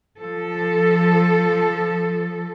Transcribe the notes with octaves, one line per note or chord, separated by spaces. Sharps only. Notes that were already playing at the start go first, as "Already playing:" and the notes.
F3 A4